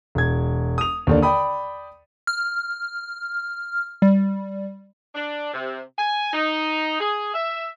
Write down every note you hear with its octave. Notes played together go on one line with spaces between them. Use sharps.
E1 G#6
D#6 F7
D#2 D3 D4
D5 G5 B5 D#6
F6
G3
D4
C3
G#5
D#4
G#4
E5